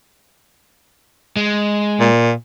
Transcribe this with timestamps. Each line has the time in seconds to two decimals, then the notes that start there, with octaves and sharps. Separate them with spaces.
1.36 G#3
2.00 A#2